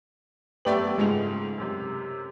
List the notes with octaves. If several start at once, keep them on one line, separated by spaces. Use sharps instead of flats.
F#2 A3 B3 G4 D5 F#7
C#2 G#2 G#3 A3 F7
F#2 C3 G4